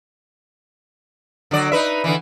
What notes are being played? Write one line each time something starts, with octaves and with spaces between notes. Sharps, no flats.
D3 F#3 D5
D#4 B4 E5
D3 E3